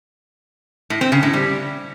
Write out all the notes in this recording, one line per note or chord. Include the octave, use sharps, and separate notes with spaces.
A2
C4
C#3
A2
G3